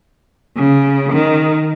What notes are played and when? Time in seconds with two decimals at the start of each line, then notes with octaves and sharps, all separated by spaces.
0.57 C#3
1.12 D#3